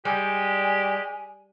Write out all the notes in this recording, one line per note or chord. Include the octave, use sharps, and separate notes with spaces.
G3 G#3 G4 G#5